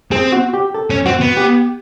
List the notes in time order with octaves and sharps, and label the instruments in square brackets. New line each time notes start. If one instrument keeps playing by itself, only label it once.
[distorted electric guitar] C4 [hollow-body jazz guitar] G#4
[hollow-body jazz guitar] F#4
G4
A4
[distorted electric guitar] C#4
[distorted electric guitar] C4 [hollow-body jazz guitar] F#4
[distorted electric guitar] B3
[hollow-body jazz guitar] G4